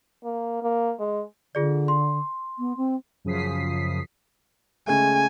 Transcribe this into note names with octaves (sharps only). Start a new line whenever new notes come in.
A#3
A#3
G#3
D3 F4 G#4 D5
C6
B3
C4
F#2 C#3 F3 D#6 B6 C7
C#3 G#3 A3 G#5